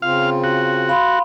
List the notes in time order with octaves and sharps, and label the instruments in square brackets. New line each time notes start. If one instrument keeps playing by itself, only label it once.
[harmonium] C#3 C4 F4 [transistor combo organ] F5
[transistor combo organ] F#4
[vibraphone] F5 B5 C6